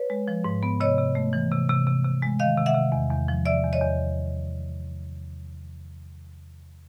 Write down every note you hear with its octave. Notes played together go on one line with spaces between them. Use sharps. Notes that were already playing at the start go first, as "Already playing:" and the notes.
Already playing: B4 C#5
G#3
F3
G#2
B3
C3 C#5 D#5
C3
A3
E3
C3
C3
C3
C3
G#3
D#3 D#5 F5
C3
E5 F#5
C3
E2
E2
F3
C3 D5 E5
E2
C#5 D#5
E2